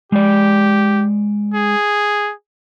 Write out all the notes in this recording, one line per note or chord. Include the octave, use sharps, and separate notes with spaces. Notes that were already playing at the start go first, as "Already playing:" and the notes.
G#3 G4 D5
G#4